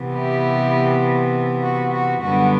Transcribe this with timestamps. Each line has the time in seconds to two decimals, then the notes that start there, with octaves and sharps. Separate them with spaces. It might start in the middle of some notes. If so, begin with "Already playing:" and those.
Already playing: C3 E3 B3
0.13 E4 G4
1.62 F#4
1.92 F#4
2.21 F#2 D3 G3 B3 F#4